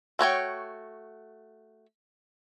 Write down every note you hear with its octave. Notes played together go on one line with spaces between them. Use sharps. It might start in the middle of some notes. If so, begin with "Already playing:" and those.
A3 F#4 C#5 G5